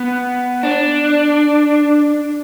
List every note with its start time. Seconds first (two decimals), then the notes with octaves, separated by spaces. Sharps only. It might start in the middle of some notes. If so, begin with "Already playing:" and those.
Already playing: B3
0.63 D4